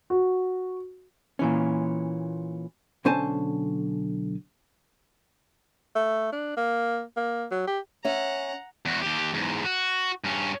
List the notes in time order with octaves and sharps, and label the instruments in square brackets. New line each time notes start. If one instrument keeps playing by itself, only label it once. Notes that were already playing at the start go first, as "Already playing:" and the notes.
[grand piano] F#4
[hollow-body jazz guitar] A#2 E3 C#4
B1 D3 C#4 C5 G#5 A5
[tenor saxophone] A3
D4
A#3
A#3
F#3
G4
[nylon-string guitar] C#4 E5 [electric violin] F#5 A#5
[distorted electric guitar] E2 F#4
D#2 G4
E2 G#2
F#4
G2 C#4